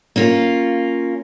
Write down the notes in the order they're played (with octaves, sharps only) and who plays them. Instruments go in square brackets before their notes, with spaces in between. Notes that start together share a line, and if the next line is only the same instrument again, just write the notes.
[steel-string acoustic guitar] A#3 C#4 F4